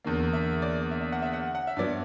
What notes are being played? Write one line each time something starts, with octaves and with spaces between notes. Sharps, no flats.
E2 D3 A#3
E5
D5
E5
E5
F#5
E5
F#5
F#5
E5
G2 F#3 B3 D5